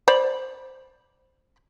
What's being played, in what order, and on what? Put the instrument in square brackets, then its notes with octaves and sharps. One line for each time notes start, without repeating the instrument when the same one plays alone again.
[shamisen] C5 D5 B5